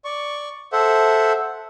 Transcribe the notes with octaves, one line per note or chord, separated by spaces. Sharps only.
D5 C#6
A4 C5 E5 F#5